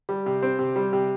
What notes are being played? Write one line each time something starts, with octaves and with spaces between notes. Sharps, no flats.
G3
C3
C4
C3
G3
C3